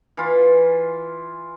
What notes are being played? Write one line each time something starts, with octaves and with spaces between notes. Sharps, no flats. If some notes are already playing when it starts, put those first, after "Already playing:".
E3 F4